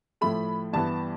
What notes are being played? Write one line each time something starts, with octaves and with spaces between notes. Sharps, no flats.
A2 F3 A3 B5
G2 E3 B3 A5